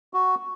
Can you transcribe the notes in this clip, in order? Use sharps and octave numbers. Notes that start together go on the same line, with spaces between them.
F#4